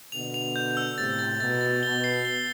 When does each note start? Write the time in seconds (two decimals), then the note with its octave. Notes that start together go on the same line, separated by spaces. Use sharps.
0.12 B2 D3 F7
0.34 F7
0.56 G6
0.77 E6
0.98 A2 C3 A6
1.19 A6
1.40 B2 A6
1.61 A6
1.83 B2 G7
2.04 C7
2.25 G7